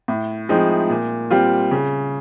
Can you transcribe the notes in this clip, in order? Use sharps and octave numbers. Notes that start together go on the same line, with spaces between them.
A2
F3 G#3 C4 D#4
A#2
G3 C4 F4
C#3